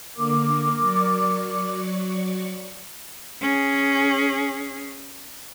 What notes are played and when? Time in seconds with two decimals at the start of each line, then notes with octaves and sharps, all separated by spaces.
0.16 D3 A#3 A#4 D6
0.80 F#3 D5 C#6
3.41 C#4 G#4